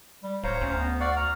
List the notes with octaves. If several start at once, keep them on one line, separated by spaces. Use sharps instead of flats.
G3
D1 C5 C#5 F5 A#5
D2 C#4
B3
D5 F5 F#5 C#6
A#5 F6